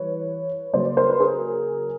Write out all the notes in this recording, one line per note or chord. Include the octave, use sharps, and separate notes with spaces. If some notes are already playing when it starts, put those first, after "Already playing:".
Already playing: E3 G3 B4 C#5
C#3 F#3 A#3 C#4 C5 D5
A#4 C5
B4
G#4 A#4